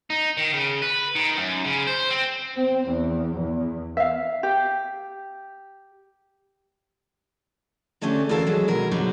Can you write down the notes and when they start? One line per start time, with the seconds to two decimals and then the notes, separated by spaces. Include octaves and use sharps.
0.10 D#4
0.37 D#3
0.53 C#3
0.82 B4
1.16 D#3
1.37 F#2
1.65 C#3
1.87 C5
2.10 C4
2.57 C4
2.87 E2
3.36 E2
3.97 E5 F5
4.43 G4
8.02 D3 A3 C#4 D4 G4
8.29 D2 E3 C#4 A4 A#4 F5
8.46 F#3 G#3
8.68 B2 D#3 A#4
8.91 G#2 B2 D3 F#3 G3